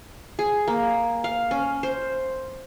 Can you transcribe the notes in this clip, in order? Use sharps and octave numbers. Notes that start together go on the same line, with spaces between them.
G#4
A#3
F5
C#4
C5